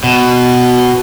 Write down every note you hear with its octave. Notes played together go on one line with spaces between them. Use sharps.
B2